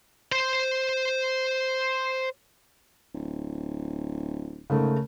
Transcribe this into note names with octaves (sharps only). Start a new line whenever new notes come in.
C5 C6
D1
G#2 C#3 A3 A#4